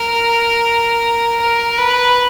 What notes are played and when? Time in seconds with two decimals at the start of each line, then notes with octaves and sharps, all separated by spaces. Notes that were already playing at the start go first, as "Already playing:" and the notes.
Already playing: A#4
1.40 A#4
1.77 B4